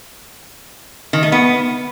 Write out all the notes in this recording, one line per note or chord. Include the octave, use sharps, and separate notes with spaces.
D#3
A3
B3